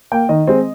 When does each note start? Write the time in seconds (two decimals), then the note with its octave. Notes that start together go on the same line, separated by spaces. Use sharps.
0.12 A#3 G5
0.29 D#3 D#5
0.47 G#3 C4